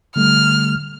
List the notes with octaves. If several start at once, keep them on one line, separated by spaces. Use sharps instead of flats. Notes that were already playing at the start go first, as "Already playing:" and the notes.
D3 G3 A3 F6